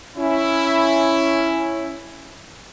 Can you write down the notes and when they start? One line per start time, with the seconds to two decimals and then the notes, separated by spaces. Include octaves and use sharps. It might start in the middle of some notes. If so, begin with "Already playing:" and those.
0.17 C#4 E4